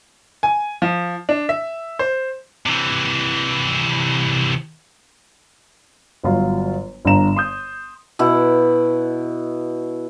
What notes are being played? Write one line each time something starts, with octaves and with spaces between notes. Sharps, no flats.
G#5
F3
D4
E5
C5
C3 E3
G1 F#3 F4
G1 G2 D3 D4 A#5 E7
C6 D#6 G6
B2 E4 F#5